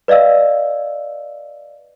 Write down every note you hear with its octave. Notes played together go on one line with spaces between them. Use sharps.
B4 D5 D#5 F5 E6